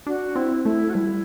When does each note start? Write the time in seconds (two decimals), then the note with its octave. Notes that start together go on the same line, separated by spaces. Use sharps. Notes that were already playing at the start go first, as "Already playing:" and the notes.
0.07 D4 F#4
0.35 C4 E4
0.65 A3 E4
0.90 F#4
0.94 G3 E4